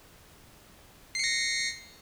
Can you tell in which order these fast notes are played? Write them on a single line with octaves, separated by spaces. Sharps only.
C7 C#7 A#6